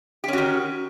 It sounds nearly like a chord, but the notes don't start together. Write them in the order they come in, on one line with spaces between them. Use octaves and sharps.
G4 C#4 F#4 D#3